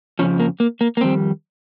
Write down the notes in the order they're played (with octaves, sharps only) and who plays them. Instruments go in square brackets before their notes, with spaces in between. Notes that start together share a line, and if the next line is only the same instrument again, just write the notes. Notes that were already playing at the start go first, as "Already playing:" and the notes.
[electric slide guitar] F2 C#3 F3 C#4
A#3
A#3
A#3
A#3
F2 D#3 G3 C4